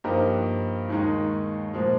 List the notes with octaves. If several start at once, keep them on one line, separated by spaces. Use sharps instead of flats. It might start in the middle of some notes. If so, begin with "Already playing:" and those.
G2 F3 A#3 D#4 G4
D#2 D#3 G#3 D#4
A#2 F3 G#3